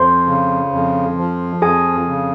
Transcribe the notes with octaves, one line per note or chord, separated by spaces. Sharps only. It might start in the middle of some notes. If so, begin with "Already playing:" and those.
Already playing: F2 C5 C6
C#3
F2
F3
F2 G#4 G#5
C#3